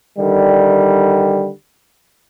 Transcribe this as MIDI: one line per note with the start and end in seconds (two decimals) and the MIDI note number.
0.19 1.50 50
0.19 1.50 51
0.19 1.50 55